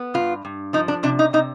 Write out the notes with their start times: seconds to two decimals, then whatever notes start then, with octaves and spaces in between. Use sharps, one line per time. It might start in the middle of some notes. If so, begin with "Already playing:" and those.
Already playing: B3
0.14 G2 F4
0.45 G2
0.73 F3 D#4
0.88 D4
1.03 C3 D4
1.19 D#4
1.33 C3 D#4